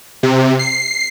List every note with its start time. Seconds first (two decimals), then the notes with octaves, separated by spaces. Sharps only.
0.23 C3
0.59 C7